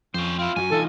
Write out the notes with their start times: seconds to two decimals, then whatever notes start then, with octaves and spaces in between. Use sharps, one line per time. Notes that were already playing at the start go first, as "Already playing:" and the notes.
0.14 F2 C#4 C5
0.39 C4 E4 F4
0.56 F#2 F#3 F#4 G#5
0.71 E3 D#4 F4 A4